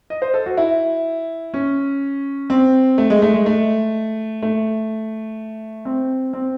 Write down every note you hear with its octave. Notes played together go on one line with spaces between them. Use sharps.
D#5
C5
A4
F#4
E4
C#4
C4
A3
G#3
A3
G#3
A3
A3
C4
C4